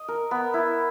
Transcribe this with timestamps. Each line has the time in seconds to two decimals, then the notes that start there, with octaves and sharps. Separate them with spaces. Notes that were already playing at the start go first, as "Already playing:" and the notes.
Already playing: D#5
0.08 A#4
0.31 B3
0.54 E4